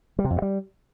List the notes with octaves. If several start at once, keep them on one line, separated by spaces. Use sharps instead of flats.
G3
C3
F2
G2
G3